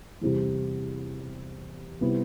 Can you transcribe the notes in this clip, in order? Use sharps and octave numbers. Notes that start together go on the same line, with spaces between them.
E2 C3 G3
C3 G3 B3 E4